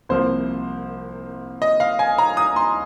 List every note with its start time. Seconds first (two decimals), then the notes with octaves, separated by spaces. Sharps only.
0.09 C2 C3 F3 A#3 C5
1.62 D#5
1.80 F5
1.99 G#5
2.18 A#5
2.37 D#6
2.56 C6